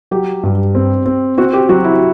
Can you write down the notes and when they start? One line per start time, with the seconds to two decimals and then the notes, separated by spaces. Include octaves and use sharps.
0.11 F#3 G4
0.43 G2
0.75 C4
1.06 C4
1.38 C4 F#4
1.53 G4
1.69 F#3 F#4
1.84 E4